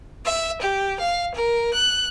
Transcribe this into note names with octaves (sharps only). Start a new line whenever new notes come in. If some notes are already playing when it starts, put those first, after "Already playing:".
E5
G4
F5
A#4
F#6